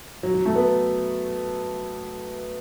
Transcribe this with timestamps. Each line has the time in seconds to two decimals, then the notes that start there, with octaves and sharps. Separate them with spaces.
0.23 F#3
0.34 F#3
0.46 A3
0.56 B3